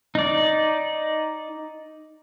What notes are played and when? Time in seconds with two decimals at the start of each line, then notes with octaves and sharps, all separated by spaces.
0.15 D#4 D5